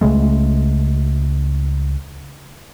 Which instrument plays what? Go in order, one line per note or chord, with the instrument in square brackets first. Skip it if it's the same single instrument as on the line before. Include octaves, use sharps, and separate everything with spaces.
[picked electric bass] C#2 C#3 G#3 A3